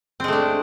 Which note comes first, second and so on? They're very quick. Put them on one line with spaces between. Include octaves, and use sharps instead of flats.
C4 G#3 A3 D4